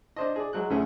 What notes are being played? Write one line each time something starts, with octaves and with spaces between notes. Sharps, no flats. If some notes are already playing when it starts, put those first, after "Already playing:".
D4 C5 D#5
G#4 D5
F#3 G#3 F#6
D2 C#3 A3 C#4 G#4